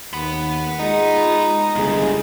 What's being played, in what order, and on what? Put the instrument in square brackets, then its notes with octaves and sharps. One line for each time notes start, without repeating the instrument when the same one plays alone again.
[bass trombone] D#2 [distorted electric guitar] F#5 B5
[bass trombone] G#3 [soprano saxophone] D#4 [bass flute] F4
[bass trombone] G1 [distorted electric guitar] E2 C#3 [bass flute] G#3